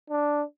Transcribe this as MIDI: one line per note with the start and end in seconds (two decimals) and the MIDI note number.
0.10 0.43 62